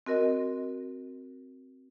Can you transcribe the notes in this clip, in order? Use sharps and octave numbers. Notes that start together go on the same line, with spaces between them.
C4 F#4 A#4 D#5